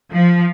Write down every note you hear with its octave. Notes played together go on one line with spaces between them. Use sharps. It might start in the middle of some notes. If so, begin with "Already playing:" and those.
F3